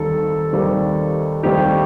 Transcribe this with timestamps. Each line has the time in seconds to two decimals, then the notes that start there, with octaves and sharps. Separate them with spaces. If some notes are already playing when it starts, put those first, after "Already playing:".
Already playing: D#2 D#3 G3 C4 D#4 A4
0.53 D#2 D#3 G3 C4 D#4
1.43 D#2 D#3 G3 C4 D#4 G4